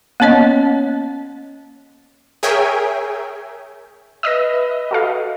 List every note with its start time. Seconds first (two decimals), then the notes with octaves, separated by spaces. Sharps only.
0.20 A#3 B3 C#4 C#5 D#5
2.43 G#4 A#4 C#5 E5 G5 G#5
4.23 B4 D#5 E5 D#6 E6 A#6
4.91 F#4 A4 F5